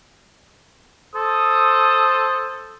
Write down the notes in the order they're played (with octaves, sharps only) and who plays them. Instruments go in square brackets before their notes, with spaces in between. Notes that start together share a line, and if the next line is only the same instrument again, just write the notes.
[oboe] A4 [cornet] C5 [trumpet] D#6